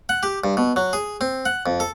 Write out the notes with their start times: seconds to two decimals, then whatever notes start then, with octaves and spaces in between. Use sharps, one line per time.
0.09 F#5
0.23 G4
0.44 G2
0.57 B2
0.76 F#3
0.93 G#4
1.21 C4
1.46 F#5
1.66 F2
1.80 A4